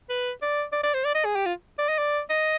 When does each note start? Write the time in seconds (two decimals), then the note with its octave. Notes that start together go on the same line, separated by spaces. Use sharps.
0.10 B4
0.42 D5
0.72 D5
0.84 D5
0.94 C5
1.04 D5
1.15 D#5
1.25 G#4
1.36 G4
1.46 F4
1.78 D5
1.89 D#5
1.98 D5
2.30 D#5